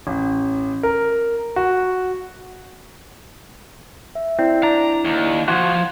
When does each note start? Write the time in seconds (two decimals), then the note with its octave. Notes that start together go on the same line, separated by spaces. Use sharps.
0.07 A1
0.83 A#4
1.56 F#4
4.15 E5
4.39 C4 E4 D5
4.63 D4 A#5
5.05 D#2
5.48 E3 F3 F#4 C6 G#6